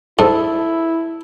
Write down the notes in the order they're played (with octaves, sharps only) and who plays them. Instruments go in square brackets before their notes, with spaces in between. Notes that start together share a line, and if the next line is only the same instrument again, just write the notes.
[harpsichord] G#2 [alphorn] E4 [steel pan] A4